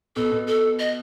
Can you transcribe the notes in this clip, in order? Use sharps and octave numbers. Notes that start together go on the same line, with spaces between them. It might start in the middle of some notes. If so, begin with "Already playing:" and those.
B2 A4
B2
A4
D#5